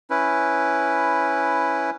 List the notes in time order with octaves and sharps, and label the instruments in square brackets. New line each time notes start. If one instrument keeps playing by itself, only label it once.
[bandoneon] C#4 E4 B4